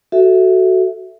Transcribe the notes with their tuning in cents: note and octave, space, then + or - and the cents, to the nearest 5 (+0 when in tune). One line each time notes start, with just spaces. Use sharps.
F#4 +15 A4 +0 E5 +0